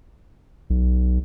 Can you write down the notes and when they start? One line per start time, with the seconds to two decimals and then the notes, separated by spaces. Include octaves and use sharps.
0.70 B1